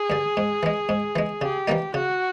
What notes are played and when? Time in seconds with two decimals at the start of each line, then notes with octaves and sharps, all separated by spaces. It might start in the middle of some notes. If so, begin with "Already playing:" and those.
Already playing: G#4
0.10 G2 D3
0.37 G#2
0.63 E3 G#3
0.89 G#2
1.16 E3 G#3
1.41 C#3 G4
1.68 E3 G3 A#3 D#4
1.94 C#3 F#4